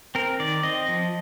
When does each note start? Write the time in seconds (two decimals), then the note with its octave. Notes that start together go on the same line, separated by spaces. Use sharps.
0.15 C4 A#4
0.40 D#3 D5
0.63 C4 D#5
0.88 F3